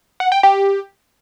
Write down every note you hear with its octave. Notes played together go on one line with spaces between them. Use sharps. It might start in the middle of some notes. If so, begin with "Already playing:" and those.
F#5
G5
G4